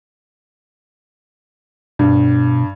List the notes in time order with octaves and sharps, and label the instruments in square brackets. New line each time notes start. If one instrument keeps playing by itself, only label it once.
[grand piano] G2 [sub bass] B2